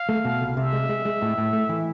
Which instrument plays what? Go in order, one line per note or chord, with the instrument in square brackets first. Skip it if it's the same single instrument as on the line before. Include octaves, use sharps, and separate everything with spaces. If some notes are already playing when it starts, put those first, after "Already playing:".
Already playing: [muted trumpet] F5
[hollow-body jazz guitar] A3
B2
C2
[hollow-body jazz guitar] C3 [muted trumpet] E5
[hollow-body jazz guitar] G#3
G#3
G#3
A2
A2
A3
E3